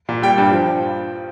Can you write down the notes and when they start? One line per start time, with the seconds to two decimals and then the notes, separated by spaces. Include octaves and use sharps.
0.09 A#2
0.22 G3 G5
0.38 G2
0.52 F3